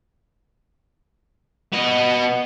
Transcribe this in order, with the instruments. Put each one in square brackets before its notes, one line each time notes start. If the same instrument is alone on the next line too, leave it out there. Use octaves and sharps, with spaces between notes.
[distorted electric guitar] B3 D#5